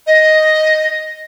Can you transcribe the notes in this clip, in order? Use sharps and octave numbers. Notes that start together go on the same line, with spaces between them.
D#5